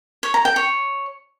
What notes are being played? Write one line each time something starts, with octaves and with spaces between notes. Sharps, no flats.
C#5
A#5
G5
C#5